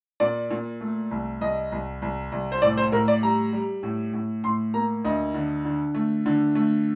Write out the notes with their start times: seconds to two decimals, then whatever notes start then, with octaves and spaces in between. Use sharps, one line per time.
0.20 A#2 D5
0.51 A#2
0.81 A3
1.11 C2
1.41 C2 D#5
1.72 C2
2.02 C2
2.32 C2
2.52 C5
2.62 A2 D5
2.78 C5
2.92 A2 A#4
3.08 D5
3.22 G3 A#5
3.53 G3
3.83 A2
4.13 A2
4.44 A2 C6
4.74 A#3 A#5
5.04 D2 D#5
5.34 D3
5.65 D3
5.95 A3
6.26 D3
6.55 A3